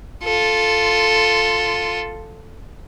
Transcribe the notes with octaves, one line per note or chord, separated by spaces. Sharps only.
F4 A4